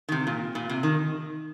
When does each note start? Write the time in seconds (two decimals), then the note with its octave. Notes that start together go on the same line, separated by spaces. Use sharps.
0.09 D#3
0.12 C3
0.27 A#2
0.55 A#2
0.69 C3
0.83 D#3